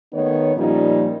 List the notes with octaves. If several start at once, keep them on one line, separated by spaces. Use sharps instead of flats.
D#3 A3 B3 D#4 C#5
A#2 F3 G3 C#4 D#4